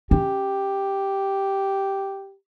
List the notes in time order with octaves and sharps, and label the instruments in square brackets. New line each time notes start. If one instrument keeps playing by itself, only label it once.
[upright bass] C#4 [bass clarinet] G4